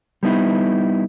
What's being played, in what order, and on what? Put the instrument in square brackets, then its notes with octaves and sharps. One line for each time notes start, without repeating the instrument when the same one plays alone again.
[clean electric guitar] G3 B3 D#4 E4